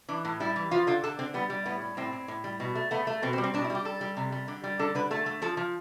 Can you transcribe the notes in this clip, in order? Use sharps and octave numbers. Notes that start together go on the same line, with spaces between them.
E3 D4
A2
G3 E4
E3
F3 F4
D3 F4
D3 A4
D3 C4
G3 B3
G3
A2 B3
G3
A2 C4
A2
A2
G3
B2
A3
A3 B3
A3
B2 C4
C4
G3
C4
B2 D4
E4
G3
G4
G3 A4
G3
C3
G3
D3
G3
D3 A4
D3 B4
A3 A4
A3
F3 A4
F3